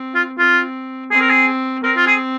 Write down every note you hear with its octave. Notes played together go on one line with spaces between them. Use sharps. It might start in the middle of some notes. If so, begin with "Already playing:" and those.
Already playing: C4
F4
C4 F4
C4 G#4
A#4
G#4
C4 A#4
F4
G#4